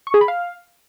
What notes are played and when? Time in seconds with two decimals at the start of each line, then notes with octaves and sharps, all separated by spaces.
0.07 C#6
0.14 G#4
0.21 B5
0.28 F5